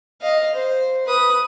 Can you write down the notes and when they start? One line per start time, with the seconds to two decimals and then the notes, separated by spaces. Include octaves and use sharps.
0.22 D#5 F5
0.55 C5
1.07 B4 D#6